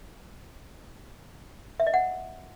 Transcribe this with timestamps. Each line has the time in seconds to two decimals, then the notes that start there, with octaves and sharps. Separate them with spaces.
1.80 E5
1.87 D#5
1.94 F#5